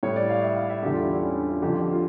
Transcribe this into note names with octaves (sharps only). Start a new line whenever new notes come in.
A2 G3 C#5
D5
F5
E5
F5
E5
E2 D3 G3 G4
F4
E4
D4
C#4
D4
F4
F2 D3 F3 G4
F4
F4